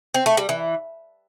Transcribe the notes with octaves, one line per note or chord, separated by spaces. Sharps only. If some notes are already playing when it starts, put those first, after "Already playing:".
C4
A3
G3
E3